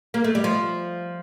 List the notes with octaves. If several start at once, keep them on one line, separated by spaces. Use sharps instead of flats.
A#3
A3
G3
F3